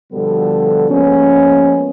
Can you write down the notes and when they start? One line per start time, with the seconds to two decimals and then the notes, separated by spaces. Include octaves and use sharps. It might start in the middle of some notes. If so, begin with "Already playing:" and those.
0.13 B2 D3 F3 G3 B3 A4
0.91 F3 G#3 A#3 B3 C#4